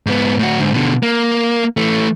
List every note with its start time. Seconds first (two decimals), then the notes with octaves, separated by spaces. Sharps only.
0.06 G#2 B3
0.39 A2 F#4
0.59 G#2 D3
0.74 B2 D3
1.03 A#3
1.77 E3 A3